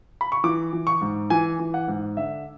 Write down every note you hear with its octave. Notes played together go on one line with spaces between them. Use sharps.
B5
C#6
E3 D6
E3
C#6
G#2
E3 G#5
E3
F#5
G#2
D3 E5